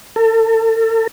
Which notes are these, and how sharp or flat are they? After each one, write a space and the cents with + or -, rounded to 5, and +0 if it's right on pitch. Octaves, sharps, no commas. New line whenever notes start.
A4 +40